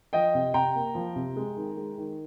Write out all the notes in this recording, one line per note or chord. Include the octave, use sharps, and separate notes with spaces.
F3 D#5 G5
C3
C3 G5 A#5
A#3
F3
C3
G#3
D#3
G#3
D#3